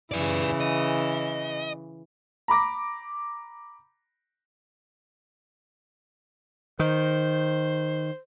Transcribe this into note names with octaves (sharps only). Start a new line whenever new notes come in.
C#3 E3 B4 D5
D#5
A#5 B5 D6 A#6
D#3 C5